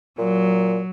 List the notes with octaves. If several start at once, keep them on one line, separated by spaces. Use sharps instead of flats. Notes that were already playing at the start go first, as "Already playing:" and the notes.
A#2 F#3